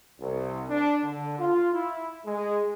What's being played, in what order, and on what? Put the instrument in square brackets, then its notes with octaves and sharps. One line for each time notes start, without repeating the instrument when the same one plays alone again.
[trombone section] C2
D4
D3
F4
E4
G#3